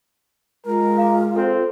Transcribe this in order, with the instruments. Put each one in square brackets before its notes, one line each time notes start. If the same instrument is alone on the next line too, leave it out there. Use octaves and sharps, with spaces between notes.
[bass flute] G#3 [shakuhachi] F4 [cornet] A#4
[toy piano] F5 A#5 D6
[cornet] C4 [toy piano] A4